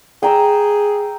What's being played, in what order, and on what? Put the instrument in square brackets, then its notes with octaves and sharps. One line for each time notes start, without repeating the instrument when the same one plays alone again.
[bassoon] G#4 [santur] G5 A#5 E6